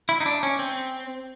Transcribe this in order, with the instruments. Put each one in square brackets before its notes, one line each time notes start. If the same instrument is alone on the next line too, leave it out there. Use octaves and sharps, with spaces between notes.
[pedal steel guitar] E4
D#4
D4
C#4
C4